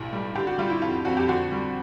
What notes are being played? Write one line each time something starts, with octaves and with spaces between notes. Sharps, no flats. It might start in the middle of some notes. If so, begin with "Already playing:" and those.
Already playing: B1 A2 E3
G3
D3 G4
F#4
G3 F4
E4
F2 F4
F2 F#4
G4
D3 F#4
G3